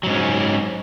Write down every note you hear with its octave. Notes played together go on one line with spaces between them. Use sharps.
G#2 F#3 C#4